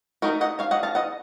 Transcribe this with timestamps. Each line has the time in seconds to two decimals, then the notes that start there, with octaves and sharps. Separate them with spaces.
0.22 A3 D#4 F#4 A#4
0.41 D#5 F#5
0.59 C#5 F5
0.71 D#5 F#5
0.83 F5 A5
0.95 D#5 F#5